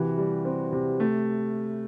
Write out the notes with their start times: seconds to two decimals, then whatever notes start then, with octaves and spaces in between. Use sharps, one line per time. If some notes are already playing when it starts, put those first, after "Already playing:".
Already playing: C3 E3 F#4
0.18 G3
0.45 C4
0.73 C3
1.00 A3